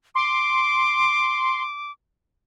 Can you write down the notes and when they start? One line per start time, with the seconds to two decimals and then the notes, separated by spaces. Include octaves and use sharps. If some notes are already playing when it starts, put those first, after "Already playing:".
0.15 C6 D6